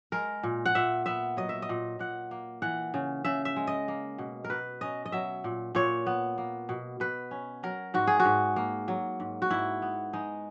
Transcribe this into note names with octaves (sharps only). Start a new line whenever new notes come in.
G#3 A#4
A#2
F#5
A#2 E5
B3 E5
F#3 D#5
E5
D#5
A#2
A#2 F#5
A#3
E3 F#5
C#3
C#3 E5
E5
G#3
D#5
A#3
B2
A#4
B2 B4
C#4 D#5
D#5
F#3 E5
A#2
A#2 C#5
B3
A#3
B2
B2 B4
C#4
F#3 A#4
G#2 F#4
G#4
F#4
G#2
A#3
F#3
G#2
F#4
G#2 E4
B3
G#3 D#4